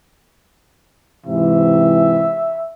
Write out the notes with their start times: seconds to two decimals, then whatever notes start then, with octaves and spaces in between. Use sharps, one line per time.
1.26 G#2 C3 E3 E5